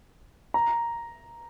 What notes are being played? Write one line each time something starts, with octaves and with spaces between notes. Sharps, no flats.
A#5